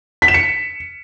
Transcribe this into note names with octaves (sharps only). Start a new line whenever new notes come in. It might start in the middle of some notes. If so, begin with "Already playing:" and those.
B6
E7
C#7